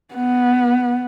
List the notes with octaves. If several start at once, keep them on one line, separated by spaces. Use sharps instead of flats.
B3